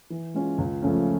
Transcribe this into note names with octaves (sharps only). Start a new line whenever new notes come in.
E3
G#3 C#4 F4
C#2
C#3 F3 A3 C#4